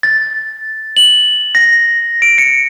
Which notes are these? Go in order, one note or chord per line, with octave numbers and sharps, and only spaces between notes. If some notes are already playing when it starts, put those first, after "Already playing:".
A6
F#7
A#6
D7
C#7